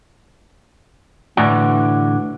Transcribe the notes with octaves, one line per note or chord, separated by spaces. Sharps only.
A2 D3 E3 D4 F#4